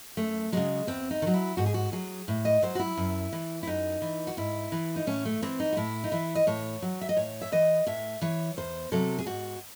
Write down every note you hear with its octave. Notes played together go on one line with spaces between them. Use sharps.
F#2 A3
C#3 F#3 G#3
E2 C4
D#4
D#3
F#3
E4
G#2 F#4
G#4
F#4
F#3 G#4
A2
D#5
F#3 C5
F#4
E4
F#2
E3
E4
F#2 D#4
E3
F#4
G#2 E4
E3
D#4
A2 C#4
A3
E3 C4
D#4
F#4
A2 E4
D#4
E3 E4
D#5
A2 C#5
F#3
E5
D#5
A2 C#5
E5
E3 D#5
A2 E5
E3 C#5
E2 C5
C3 F#3 A4
G#4
G#2 F#4